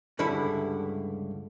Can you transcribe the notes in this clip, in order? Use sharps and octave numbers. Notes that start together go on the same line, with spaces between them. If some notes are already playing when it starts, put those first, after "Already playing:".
C#2 G2 D3 G3 E4 B5